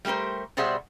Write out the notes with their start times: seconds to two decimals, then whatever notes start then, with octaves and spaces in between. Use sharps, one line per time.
0.05 G3 A3 G4 A#4 C5
0.57 B2 G3 G#4 C5 E5 F#5